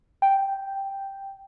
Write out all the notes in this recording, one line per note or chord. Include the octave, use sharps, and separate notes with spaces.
G5